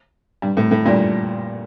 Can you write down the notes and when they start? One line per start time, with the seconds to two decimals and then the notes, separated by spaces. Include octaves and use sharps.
0.42 G2
0.57 A2
0.71 A2
0.85 G2 A#2